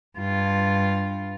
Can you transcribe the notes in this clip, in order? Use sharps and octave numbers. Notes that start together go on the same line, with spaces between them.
G2 F4